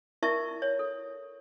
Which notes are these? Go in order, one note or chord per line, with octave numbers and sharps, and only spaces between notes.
E4 A#4 D5 E5 A5 C#6
C#5
A4